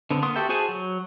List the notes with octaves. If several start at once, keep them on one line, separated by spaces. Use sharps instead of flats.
D3 B3 C4
A#3 B3 C6 D#6
F#4 G4 A4 E5 G5
F#4 G#4 C5 G#5 A5
F#3